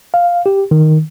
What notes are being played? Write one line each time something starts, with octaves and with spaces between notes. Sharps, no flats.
F5
G4
D#3